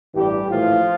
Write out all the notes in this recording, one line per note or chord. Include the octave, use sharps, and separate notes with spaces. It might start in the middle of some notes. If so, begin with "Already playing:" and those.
A1 G2 E3 G3 G4
A#1 A2 E3 F3 A3 F4